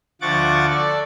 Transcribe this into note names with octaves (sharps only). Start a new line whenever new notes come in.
D2 F3 F#5 C#6 D6 A6
A4 D5